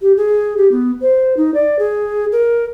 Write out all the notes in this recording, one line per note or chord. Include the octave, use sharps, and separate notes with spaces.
G4
G#4
G4
B3
C5
D#4
D5
G#4
A#4